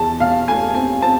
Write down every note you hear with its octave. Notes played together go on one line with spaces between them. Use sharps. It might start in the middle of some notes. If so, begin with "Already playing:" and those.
Already playing: E2 A5
B2 F5
A3 G#5
C4 G#5
C4 A5